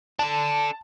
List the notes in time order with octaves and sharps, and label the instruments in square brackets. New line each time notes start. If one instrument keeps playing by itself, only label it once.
[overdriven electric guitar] D4 A4 [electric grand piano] A5